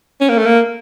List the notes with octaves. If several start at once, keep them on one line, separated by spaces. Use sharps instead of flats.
C#4
A#3
A3
A#3